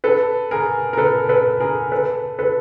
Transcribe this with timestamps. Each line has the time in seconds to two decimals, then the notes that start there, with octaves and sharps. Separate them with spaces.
0.04 A4 B4
0.51 G#4 A#4
0.93 A#4
0.97 A4 B4
1.29 A4 B4
1.60 G#4 A#4
1.92 A4 B4
2.39 A4 B4